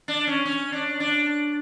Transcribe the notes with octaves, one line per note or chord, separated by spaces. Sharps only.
D4
C#4
C#4
D4
D4